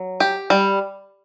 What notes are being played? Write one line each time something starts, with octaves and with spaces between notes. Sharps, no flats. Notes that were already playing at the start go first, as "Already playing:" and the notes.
Already playing: F#3
G4
G3